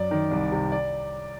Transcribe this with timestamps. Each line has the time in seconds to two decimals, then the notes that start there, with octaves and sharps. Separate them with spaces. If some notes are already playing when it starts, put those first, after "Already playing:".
Already playing: F#2 D5
0.11 D#3
0.31 C2
0.52 C3
0.72 D5